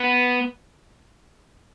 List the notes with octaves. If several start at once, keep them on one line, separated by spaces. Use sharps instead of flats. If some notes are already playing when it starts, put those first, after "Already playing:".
Already playing: B3